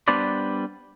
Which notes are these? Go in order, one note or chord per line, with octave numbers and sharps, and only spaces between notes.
G3 B3 D4 B4 C5 D5